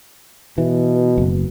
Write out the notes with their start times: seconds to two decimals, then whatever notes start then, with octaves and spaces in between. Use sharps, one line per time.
0.58 B2 E3
1.18 F#1